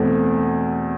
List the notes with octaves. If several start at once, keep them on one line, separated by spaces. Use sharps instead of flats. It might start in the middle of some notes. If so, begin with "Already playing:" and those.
Already playing: E2 B2 A3 C4